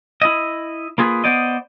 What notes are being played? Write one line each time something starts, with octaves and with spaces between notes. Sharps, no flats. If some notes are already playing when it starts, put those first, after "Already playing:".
E4 D#5
A#3 F4 G#4 A4 B4
B3 C5 D5 D#5